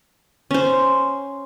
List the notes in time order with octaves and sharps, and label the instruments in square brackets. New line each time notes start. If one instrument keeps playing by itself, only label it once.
[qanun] C#4 C5